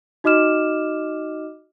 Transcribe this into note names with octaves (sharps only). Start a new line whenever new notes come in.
D#4 F#4 D#5 D6 F6 E7